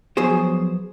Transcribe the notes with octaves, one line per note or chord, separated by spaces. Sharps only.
F3 F#3 B3 G#4 C5